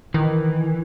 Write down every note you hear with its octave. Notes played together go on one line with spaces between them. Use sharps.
D#3 E3